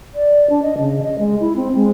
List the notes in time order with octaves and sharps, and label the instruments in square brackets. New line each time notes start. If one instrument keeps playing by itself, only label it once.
[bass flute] D5
D4
D#5
C#3
D#5
G#3
E4
C4
G#3